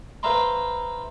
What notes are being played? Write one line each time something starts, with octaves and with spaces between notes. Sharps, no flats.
B4 C5 E5 F5 A#5 C6